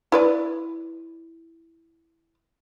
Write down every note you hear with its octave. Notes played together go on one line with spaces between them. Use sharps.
E4 B4 D5